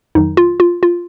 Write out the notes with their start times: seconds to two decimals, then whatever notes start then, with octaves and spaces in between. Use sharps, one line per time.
0.15 F2 D#3 F#3 D#4
0.37 F4
0.60 F4
0.83 F4